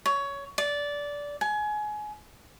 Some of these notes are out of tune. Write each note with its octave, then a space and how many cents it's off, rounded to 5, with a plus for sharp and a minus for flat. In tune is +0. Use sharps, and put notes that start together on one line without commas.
C#5 +15
D5 -15
G#5 +25